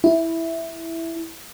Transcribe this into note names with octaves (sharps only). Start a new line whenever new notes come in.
E4